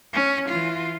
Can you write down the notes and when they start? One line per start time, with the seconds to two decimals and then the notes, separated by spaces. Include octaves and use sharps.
0.13 C#4
0.48 E3 F4